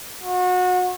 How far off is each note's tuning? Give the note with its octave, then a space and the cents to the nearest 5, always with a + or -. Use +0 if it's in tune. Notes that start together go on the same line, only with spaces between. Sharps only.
F#4 -30